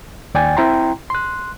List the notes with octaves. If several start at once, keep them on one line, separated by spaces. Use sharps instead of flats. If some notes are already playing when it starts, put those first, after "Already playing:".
D#2 D5 G5 G#5 A6
C4 E4 G5 A#5 C6
C6 F#6